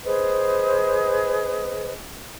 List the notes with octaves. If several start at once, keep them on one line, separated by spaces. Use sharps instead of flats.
G#4 B4 C5 D#5